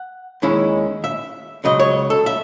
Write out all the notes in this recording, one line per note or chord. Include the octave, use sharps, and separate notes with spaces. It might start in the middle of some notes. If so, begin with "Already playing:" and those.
Already playing: F#5
D#2 D#3 G#3 C#4 E4
E5
C#2 C#3 F#3 D#5
C#5
A4
E5